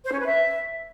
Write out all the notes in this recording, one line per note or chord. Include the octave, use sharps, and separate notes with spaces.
C5
C#4
B4
E5